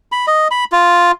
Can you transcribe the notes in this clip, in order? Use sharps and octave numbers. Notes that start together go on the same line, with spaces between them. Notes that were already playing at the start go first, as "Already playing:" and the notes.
B5
D#5
B5
F4